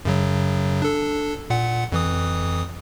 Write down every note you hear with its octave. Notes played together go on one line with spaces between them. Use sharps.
F#2 C#3 F#3
D4 A4
A#2 F#5
F2 E3 D#6